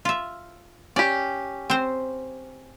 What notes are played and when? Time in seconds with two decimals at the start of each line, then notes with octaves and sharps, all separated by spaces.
0.05 F4 E5
0.96 C#4 G4 D5
1.70 C4 C5